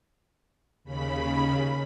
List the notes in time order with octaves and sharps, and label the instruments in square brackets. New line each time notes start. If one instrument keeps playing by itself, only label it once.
[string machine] D#2 C#3 B5